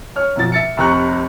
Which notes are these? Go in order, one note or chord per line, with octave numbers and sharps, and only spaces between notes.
C#5 F6
F#2 B2 F3 A6
E5 A6 C#7
F1 C3 A#5 C#6 F#6